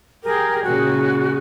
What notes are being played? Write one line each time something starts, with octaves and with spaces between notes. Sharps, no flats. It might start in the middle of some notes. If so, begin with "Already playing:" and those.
G4 G#4 A#4 G5
A#2 C#3 G#3 F#4